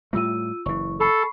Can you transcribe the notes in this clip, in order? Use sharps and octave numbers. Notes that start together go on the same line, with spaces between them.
A2 G3 A3 F4 E6 D#7
F#1 E3 E4 C#6
A4 B5 C#6 C7